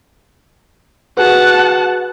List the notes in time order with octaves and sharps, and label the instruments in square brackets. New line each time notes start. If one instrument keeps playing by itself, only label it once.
[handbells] F#4 G#4 B4 [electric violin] F#5 A5